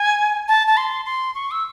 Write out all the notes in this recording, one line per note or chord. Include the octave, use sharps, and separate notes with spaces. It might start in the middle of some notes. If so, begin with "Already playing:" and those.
Already playing: G#5
A5
A5
C6
C6
C#6
E6